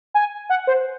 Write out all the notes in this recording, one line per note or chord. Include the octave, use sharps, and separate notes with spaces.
G#5
F#5
C5